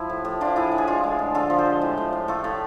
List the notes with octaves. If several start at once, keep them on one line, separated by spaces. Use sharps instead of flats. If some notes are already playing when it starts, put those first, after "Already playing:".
Already playing: F3 E4
A2
A2
F3 D4 F4
A2 E4 G#4
A2
G#4
G#3 F4 A4
G#3
D3
D3 F4 A4
F3
A4 C5
G#3
A2
A2
A2
A3 F4 A4
A2